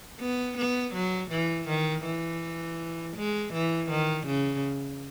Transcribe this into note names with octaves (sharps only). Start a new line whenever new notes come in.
B3
B3
F#3
E3
D#3
E3
G#3
E3
D#3
C#3